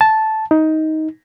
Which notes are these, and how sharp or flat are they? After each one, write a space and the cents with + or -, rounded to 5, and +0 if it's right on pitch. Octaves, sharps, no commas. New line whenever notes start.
A5 -10
D#4 +15